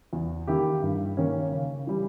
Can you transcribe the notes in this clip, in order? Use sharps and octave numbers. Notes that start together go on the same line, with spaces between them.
E2
D#3 A#3 E4 G4
G2
D#3 A#3 C#4
C#3
E3 G3